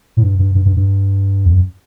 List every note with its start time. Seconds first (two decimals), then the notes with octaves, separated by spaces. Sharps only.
0.17 A2
0.23 G2
0.39 G2
0.55 G2
0.65 G2
0.76 G2
1.46 E2
1.51 F#2